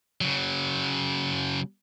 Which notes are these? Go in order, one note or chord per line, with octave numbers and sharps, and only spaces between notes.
C#3 F#3